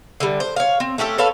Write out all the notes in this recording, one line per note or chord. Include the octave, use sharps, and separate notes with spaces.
D3 G3
C5
C#5 F5
C4
A3 C#4 G4 A4
A4 B4 C#5 F5